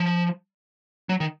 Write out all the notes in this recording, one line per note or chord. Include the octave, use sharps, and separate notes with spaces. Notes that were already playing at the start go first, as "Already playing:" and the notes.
Already playing: F3
F#3
D#3